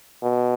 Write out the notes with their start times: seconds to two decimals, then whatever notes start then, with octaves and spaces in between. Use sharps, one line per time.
0.23 B2